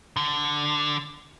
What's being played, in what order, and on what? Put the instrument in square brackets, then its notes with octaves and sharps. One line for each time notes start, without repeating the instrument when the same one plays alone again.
[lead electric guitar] D3